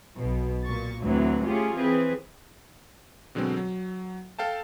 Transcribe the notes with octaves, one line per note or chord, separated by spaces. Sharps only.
B1 B2
A#2 C#6 A6
D2 A2 E3 F#3 C4
A3 C#4 F4 G4 G#4
E3 C4 G#4 B4
B2 D3 F#3 G#3 C4
F#3
A4 F5 G5 A5